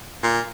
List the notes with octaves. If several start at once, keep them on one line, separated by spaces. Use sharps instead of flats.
A#2